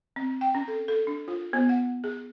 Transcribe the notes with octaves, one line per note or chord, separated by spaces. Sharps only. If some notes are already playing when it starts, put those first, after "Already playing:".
C4
G5
C#4
A4
A4
D4
F4
B3
F#5
G#4